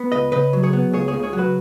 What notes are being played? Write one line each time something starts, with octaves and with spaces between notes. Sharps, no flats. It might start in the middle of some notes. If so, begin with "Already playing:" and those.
Already playing: B3
C#2 B4 D#5
C#3 B4 D#5
F#3
G#4 C#5
B3
C#2 G#4 C#5
G#4 C#5
C#3
G#4 C#5
F#3
F#4 B4